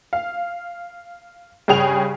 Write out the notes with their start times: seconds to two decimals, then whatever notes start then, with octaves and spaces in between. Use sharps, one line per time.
0.13 F5
1.68 G2 C#3 G#4 G5 F7